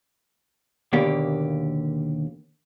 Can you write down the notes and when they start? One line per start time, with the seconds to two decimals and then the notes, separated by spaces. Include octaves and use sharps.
0.93 D#2 B2 D3 A#3 G4